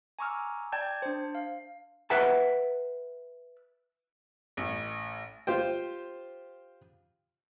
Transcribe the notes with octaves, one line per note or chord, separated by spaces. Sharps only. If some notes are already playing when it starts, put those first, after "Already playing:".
G#5 A#5 C#6 D6 E6 F6
D5 G5 A5 G6 G#6
D4 C5
F5
B4 E5 F#5 G5 A5
A1
F4 G4 C5 G5